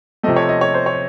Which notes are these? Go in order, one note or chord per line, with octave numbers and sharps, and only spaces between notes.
C3 F3 A3 D#5
C#5
D#5
C#5
C5
C#5